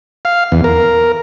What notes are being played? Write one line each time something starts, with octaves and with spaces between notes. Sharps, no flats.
F5
E2
A#4